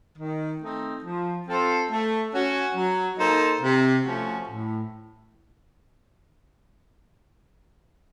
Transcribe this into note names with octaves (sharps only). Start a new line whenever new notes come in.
D#3
A3 C4 D#4
F3
C4 F4 A4 C5
A3
C#4 F#4
F#3
A#3 D#4 A4 C5
C3
F3 A3 C#4 F#4
A2